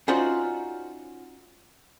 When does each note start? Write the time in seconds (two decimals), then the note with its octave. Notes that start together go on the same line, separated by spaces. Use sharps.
0.08 C#4 D#4 F4 F#4 C5 D5